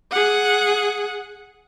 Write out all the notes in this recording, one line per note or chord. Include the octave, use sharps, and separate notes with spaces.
G#4 F#5